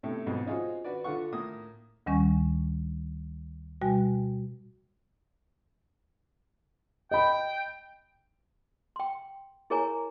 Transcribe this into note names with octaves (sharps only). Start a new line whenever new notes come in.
B1 A2 C3 A4
B1 F2 G#2 B2
C#4 D#4 F4 F#4 G#4 C5
F#4 B4 D5
D3 F4 A4 F#5 C#6
A2 A#3 D#6
D2 D#3 G3 C#4 G#5 C#6
B2 G3 F#4 G5 G#5
D#5 G5 B5
G5 C6
E4 G#4 A#4 C#5 G#5 A#5